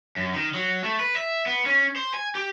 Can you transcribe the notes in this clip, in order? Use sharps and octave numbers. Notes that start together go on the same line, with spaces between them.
F#2
D#3
F#3
A3
B4
E5
B3
C#4
C5
G#5
G4